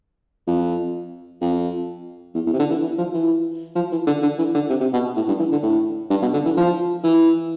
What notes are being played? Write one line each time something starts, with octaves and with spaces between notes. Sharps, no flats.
F2
F2
E2
E2
C3
D3
E3
E3
F3
E3
F3
E3
D3
D3
E3
D3
C3
C3
B2
A2
G2
E3
D3
A2
G2
B2
D3
E3
F3
E3